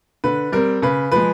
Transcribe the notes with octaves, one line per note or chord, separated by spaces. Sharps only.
D3 B4
G3 C4 A#4
C#3 B4
F3 G#3 B4